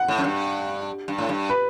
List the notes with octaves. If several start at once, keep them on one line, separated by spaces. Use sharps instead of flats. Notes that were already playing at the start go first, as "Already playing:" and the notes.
Already playing: F#5
A2
F#2
G2
G2
A2
G2
B4